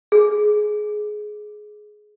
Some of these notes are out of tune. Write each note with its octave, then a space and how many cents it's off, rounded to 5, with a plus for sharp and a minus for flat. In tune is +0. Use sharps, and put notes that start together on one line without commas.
G#4 +20